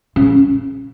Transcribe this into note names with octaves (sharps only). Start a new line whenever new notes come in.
C#3